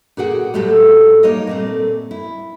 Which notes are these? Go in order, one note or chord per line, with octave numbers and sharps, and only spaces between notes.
A#2 F#4 G#4 F#5 G5
A2 F#3 G#3 A3 G4 A4
G3 A#3 D#4 C#5 D#5
A#2 A3 C4
E4